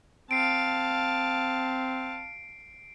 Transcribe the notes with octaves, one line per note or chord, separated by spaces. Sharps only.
C4 F5 A5 C7 D7